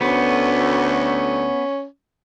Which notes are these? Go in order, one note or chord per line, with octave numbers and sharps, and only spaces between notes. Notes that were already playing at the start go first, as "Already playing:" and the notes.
D2 B3 C#4